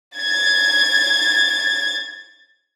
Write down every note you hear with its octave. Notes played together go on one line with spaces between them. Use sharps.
G#6 A6